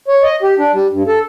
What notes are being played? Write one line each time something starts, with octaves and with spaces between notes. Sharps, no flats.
C#5
D#5
G4
D4
G3
G2
A4